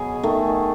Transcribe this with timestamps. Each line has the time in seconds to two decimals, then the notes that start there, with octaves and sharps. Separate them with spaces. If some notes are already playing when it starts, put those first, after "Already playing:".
Already playing: B2 F#3 G#4
0.23 D#3 A3